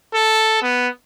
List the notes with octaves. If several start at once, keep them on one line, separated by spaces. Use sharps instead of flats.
A4
B3